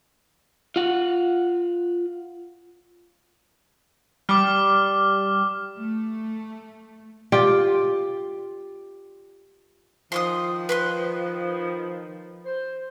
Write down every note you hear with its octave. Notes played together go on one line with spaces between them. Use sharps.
F4 F#5
G3 D6 F6
A3
F4 G4 D5
D#3 F3 C6 D6 D#6
B4 C6 F#6
C5